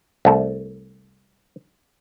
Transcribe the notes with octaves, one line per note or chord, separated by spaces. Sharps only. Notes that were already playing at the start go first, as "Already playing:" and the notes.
C2 A3